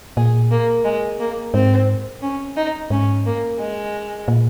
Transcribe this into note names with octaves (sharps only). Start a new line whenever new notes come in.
A#2 G#4
A#3
G#3
A#3
G#2 C4
C#4
D#4
G#2 C#4
A#3
G#3
A#2